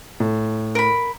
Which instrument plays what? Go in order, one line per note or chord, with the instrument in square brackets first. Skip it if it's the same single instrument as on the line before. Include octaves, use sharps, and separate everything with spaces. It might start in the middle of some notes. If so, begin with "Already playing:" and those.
[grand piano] A2
[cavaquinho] A#4 B5